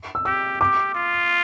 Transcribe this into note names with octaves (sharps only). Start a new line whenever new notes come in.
E6
G4 E6
G4 D6
F4